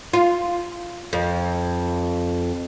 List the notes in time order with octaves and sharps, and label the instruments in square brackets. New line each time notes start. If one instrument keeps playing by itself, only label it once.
[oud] F4
F2